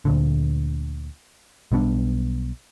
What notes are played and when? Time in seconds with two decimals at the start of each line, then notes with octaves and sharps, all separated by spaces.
0.05 D2 A#2 D3
1.72 B1 G3 B3 D4